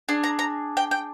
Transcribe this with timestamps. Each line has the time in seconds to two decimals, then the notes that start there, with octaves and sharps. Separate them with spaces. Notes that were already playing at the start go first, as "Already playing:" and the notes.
0.09 D4 G#4
0.23 A#5
0.39 A#5
0.77 G5
0.91 G5